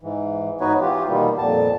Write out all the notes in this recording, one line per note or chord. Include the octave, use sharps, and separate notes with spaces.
G#2 E3
G#2 B3 D#4 F#4 B4 C#5
E3 F4 G4
B2 D#3 G3 A#3 B3
F2 A#2 A5